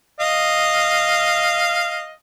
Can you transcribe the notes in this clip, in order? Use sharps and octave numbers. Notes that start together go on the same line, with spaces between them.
D#5 F5